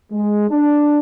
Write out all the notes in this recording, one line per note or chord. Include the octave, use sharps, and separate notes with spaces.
G#3
D4